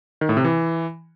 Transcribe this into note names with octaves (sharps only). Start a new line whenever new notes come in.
D#3
A2
C3
E3